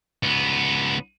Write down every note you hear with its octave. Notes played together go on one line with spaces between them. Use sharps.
C#2 B3